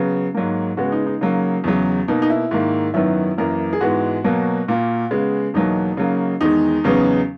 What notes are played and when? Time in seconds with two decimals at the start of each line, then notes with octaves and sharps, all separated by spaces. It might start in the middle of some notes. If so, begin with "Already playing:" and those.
Already playing: C#3 F#3 B3
0.34 G#2 F#3 A#3
0.77 C#3 G#3 B3 F#4
0.92 D#4
1.06 D#4
1.21 C#3 F#3 A#3
1.64 E2 C#3 F#3
2.08 B2 A#3 D#4
2.22 D#4
2.30 E4
2.51 G#2 D#3 A#3
2.94 F#2 D#3 F#3 B3 E4
3.38 F#2 E3 A#3 A#4
3.73 G#4
3.81 G#2 E3 G#3 B3 F#4
4.24 B2 F#3 A#3
4.68 A#2 A#3
5.11 C#3 G#3 B3
5.54 E2 B2 F#3 A#3 D#4
5.97 C#3 F#3 A#3
6.41 E2 D#3 G#3 D#4
6.84 E2 C#3 F#3 B3